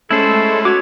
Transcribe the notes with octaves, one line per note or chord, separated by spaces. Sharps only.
G#3 A3 C#4 E4 A4 C5
B3 F#4 C#5 D6